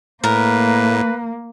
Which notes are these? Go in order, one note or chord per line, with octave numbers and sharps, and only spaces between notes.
A2 A#3 A#4 B4